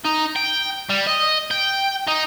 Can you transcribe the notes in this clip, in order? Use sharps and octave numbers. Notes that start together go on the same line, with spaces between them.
D#4
G5
G3
D#5
G5
D#4